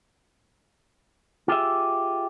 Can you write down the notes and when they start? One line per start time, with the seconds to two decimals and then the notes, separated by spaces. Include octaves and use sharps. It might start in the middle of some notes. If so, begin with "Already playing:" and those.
1.48 F4 G4 G#4 E5